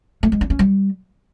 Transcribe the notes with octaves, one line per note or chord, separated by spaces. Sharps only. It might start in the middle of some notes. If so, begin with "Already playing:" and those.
A3
G#3
D4
C#4
G3